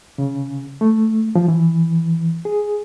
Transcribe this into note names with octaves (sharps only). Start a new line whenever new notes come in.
C#3
A3
F3
E3
G#4